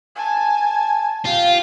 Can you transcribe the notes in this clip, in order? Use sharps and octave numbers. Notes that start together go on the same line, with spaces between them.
G#5 A5
F4 G4 F5